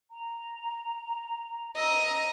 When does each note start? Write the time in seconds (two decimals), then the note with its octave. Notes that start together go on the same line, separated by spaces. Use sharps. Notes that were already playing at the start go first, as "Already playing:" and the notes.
0.11 A#5
1.77 D#5 A#5 E6